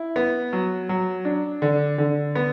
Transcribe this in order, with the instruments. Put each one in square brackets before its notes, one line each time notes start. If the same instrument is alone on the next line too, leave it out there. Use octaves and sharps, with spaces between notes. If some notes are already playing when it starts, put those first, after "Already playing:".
Already playing: [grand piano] E4
B3
F#3
F#3
D4
D3
D3
B3